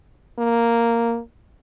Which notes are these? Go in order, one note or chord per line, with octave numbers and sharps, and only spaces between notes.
A#3